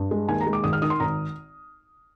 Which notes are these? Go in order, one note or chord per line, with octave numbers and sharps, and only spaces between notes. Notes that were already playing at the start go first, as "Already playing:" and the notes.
Already playing: G2
G#3
D#2 G#5
A#5
G#3
D6
G#1 D#6
F6
D#3 D#6
C6
G#1 A#5